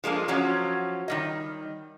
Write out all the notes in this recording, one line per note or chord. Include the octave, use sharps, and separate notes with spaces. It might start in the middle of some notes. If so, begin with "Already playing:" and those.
F3 G#3 A#3 D4
F3 F#3 C#4
D#3 G3 D#5